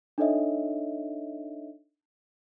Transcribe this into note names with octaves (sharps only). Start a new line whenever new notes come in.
D4 D#4 A4 C#5 D#5 E5